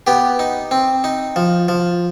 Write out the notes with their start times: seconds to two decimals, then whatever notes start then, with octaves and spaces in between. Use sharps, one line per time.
0.07 B3 G4
0.39 D#4
0.71 C4
1.04 D#4
1.36 F3
1.68 F3